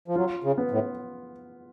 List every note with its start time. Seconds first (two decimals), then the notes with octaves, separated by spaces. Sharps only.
0.08 F3
0.16 F#3 F4
0.44 C#3
0.58 B3
0.71 A2